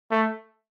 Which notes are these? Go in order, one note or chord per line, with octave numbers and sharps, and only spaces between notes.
A3